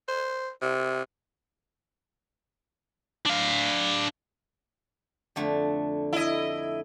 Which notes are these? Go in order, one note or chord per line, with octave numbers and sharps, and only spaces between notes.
C5
C3
D4 F5
F2 D3 A3
E4 D#5